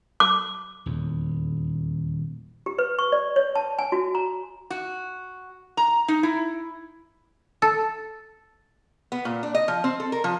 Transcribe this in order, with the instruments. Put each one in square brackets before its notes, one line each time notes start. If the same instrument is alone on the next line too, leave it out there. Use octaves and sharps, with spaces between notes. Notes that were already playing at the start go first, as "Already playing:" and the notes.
[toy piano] D6
[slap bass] D#1 E2
[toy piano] G4
B4
C#6
D5
C#5
A5
G#5
F#4
A#5
[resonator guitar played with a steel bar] F#4
A#5
D#4
E4
[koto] A4
[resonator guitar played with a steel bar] B3
A#2
D4
D#5
F3
C4
A4
A#4
F3